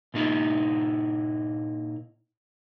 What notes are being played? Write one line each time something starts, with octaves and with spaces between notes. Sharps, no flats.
A#2 A#3 D#4 E4